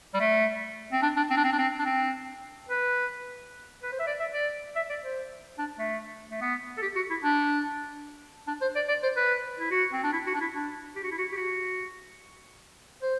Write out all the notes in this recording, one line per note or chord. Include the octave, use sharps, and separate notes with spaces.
G3
A3
C4
D4
D4
C4
D4
C4
D4
C4
D4
C4
B4
B4
C5
E5
D5
E5
D5
E5
D5
C5
D4
A3
A3
B3
A4
G4
F#4
E4
D4
D4
C5
D5
D5
C5
B4
E4
F#4
C4
D4
E4
F#4
D4
E4
D4
G4
F#4
E4
F#4
G4
F#4
C5